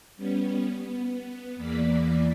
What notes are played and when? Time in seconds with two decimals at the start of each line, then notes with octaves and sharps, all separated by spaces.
0.17 G3 B3 C#4
0.68 B3
1.56 E2 E3 A#3 D5 B6